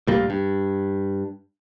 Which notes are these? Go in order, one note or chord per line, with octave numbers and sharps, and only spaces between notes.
D2 A#2 G3 A#3
G2